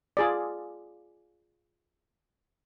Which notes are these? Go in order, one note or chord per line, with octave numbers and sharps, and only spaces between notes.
F4 G#4 D5